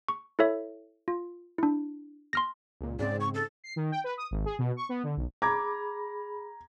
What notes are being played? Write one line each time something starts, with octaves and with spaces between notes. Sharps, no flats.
C#6
E4 A4 C#5 E5
F4
D4 E4
C6 F6 A#6
C#2 A#2
G#2 C#3 C4 D5
C#6
A4
C7
D#3
G5
B4
D#6
G#1
G#4
B2
C#6
B3
D3
B1
G#4 A#5 B5 D6 G#6